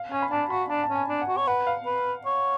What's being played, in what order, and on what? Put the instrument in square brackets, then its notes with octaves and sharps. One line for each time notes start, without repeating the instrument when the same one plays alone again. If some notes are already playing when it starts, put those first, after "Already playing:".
Already playing: [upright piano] F5
[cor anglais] C#4 [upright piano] G#5
[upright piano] B5
[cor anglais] D4 [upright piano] A5
[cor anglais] F#4 [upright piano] B5
[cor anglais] D4 [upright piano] A5
[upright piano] A5
[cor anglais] C#4
[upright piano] G#5
[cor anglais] D4
[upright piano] F#5
[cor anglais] F#4
C#5
[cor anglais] B4 [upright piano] F#5
[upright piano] F5
[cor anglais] B4
C#5